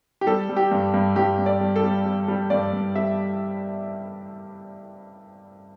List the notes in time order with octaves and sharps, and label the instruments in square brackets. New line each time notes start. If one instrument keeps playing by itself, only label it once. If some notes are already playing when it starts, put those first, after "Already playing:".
[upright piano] G4
G3 A4
G3
G4
G2
G2
G2 G4
G2
D5
G3
A4
G3
G3
G3
G2 D5
G2
G3 E5